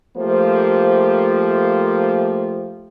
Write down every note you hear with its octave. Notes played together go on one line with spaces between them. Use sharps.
F3 A3 A#3 G4 C5